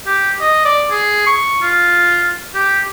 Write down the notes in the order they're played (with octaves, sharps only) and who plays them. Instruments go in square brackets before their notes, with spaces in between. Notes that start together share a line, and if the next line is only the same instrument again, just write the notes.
[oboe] G4
D#5
D5
G#4
C#6
F4
G4